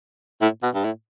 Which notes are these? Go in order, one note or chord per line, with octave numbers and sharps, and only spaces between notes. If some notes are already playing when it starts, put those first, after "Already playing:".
A2
B2
G2
A2